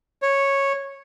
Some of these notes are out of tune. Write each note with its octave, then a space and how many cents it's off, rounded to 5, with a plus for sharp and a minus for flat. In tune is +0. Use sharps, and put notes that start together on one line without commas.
C#5 -10